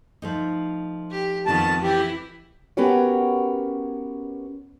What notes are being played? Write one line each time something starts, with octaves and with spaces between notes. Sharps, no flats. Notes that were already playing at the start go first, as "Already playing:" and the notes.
F3 A3 D#4
G4
F2 D#3 B3 A5
E3 E4 G4
B3 C#4 F#4 G4 A#4 C#5